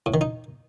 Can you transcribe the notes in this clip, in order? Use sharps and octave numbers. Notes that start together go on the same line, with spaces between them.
A2
D#3
D#4